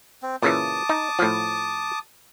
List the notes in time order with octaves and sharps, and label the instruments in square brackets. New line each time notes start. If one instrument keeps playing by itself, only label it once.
[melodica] C4
[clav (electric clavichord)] A#2 C#3 E3 [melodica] A5 D6 D#6
[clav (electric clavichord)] D#4
A2 F3